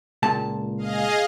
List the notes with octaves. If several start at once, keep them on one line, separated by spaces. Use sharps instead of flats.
C#2 A#2 A5
G#4 D#5 F5